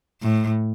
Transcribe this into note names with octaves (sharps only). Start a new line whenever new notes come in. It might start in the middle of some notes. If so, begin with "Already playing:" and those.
A2